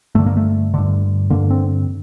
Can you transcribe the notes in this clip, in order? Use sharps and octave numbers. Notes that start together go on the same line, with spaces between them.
G2 D3 A3
A#3
A3
G2 D3
G2 D3 A#3
C4